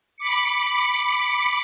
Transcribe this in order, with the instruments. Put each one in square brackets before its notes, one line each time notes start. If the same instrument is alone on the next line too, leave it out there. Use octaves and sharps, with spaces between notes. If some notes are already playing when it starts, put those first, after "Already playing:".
[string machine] B5 D6 C#7